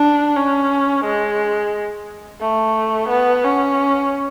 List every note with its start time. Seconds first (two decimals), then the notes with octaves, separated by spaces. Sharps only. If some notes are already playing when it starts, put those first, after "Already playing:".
Already playing: D4
0.36 C#4
1.04 G#3
2.41 A3
3.09 B3
3.44 C#4